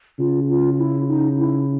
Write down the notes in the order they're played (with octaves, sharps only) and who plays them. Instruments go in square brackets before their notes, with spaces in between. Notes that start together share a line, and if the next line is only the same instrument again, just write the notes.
[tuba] C#3 [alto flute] F4
[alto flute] F4
E4
D#4
E4